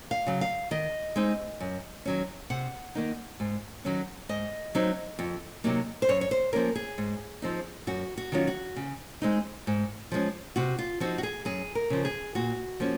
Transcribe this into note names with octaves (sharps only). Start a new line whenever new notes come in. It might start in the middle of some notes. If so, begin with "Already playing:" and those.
F5
C#3 F#3
F5
D#3 D#5
G#3 C4 D#4
F#2
D#3 F#3 C#4
C3 F#5
D#3 A#3 D#4
G#2
D#3 F#3 C#4
G#2 D#5
F#3 C4 D#4
F2
C3 F#3 A#3 D#4
C5
F#2 C#5
C#5
C5
F3 A#3 C#4 A#4
G#4
G#2
F3 C4 D#4
F#2 F#4
F#4
D#3 F#3 C#4 F4
F#4
C#3
G#3 C4 D#4
G#2
F3 G#3 C#4
C3 F#4
F4
F3 C4 D#4 F#4
F#4
G#4
F#2 G#4
A#4
C#3 F3
G#4
A#2 F#4
F3 A#3 C#4